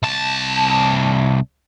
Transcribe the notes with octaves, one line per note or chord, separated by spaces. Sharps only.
C2 A5